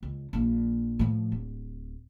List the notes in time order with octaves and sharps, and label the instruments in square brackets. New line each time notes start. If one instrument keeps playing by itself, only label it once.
[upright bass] C#2
A#1 A#3
A2 F3
D1